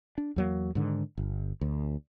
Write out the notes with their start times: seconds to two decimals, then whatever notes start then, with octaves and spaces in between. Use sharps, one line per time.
0.18 D4
0.36 E2 F#3 A#3
0.75 G#2 D3 D#3
1.18 G1
1.61 D2